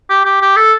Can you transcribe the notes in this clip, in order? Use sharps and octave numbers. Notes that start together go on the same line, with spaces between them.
G4
G4
G4
A4